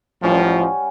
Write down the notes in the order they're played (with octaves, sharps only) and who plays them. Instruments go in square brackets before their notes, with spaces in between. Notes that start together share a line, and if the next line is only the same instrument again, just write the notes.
[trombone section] A1 F3 [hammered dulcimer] G3 C#4 F#5